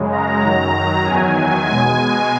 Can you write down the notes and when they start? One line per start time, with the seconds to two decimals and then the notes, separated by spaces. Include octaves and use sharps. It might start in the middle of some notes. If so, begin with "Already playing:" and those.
Already playing: F#2 C#3 G#3
0.12 A#5
0.42 F#2 D#3 F#3 A#5
1.05 E2 D#3 F#3 G#5
1.67 B2 G#3 G#5